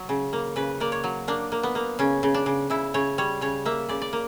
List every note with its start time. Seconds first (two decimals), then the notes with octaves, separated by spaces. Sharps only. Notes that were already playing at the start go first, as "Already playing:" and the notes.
Already playing: F#3
0.09 C#3
0.33 A#3
0.56 C#3 B4
0.80 A#3 D5
0.92 C#5
1.04 F#3
1.28 A#3 D4
1.52 A#3
1.63 B3
1.75 A#3
1.99 C#3 C#4
2.23 C#3
2.34 D4
2.46 C#3
2.70 C#3 E4
2.94 C#3 C#5
3.18 G3 C#5
3.41 C#3 C#5
3.65 A#3 E5
3.89 C#3 D5
4.02 D5
4.13 A#3